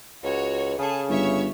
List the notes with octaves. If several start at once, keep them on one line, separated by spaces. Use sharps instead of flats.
C#2 F#4 C#5
C#3 G#4 A4 A5
G1 C#5 E5 C#6